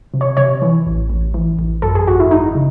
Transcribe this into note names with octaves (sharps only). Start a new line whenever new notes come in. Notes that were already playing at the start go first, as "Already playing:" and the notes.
C3
C#5
C3 C#5
E3
A1
A1
E3
A1
F#2 A4
G#4
G#1 F#4
E4
G#1 D#4
C#3